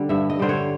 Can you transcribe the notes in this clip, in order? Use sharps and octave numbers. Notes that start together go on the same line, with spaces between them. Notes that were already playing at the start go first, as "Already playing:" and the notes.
Already playing: D3 G3
G2 E5
D#5
D3 G3 C5
C#5